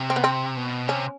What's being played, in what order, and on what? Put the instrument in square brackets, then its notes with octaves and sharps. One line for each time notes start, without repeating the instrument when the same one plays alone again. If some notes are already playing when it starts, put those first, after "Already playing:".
Already playing: [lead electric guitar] C3
[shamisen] C4
B3
C4
[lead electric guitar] B2
[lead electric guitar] C3 [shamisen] C#4